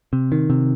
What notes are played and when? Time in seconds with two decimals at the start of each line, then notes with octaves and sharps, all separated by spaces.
0.13 C3
0.32 D#3
0.50 C3